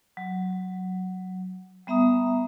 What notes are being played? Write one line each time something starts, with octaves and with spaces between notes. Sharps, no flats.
F#3
G3 B3 E5 A#5 D#6